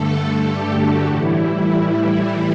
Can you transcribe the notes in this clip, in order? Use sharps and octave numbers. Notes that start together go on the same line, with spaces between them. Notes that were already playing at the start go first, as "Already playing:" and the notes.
Already playing: G2 D3 A3 A4
G4
F#4
A2 E3 G3 E4